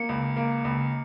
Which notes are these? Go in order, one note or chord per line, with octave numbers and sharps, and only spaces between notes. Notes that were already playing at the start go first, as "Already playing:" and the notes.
Already playing: A#3 C#7
C#2
A#3
C#2